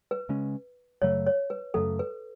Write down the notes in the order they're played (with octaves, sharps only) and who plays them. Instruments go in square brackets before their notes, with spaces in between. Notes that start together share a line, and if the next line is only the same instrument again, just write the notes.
[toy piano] B4
[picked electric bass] C#3 G#3 C#4
[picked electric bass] F#2 C#3 F#3 A3 [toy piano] C#5
[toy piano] C#5
B4
[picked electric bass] F#2 C#3 F#3 A3 [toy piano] A4
[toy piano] B4